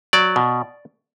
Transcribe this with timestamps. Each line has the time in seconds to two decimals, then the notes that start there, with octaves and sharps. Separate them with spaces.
0.13 F#3 D5
0.36 B2